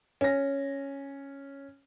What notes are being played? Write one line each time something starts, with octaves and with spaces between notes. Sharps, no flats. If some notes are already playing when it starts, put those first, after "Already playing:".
C#4 A#6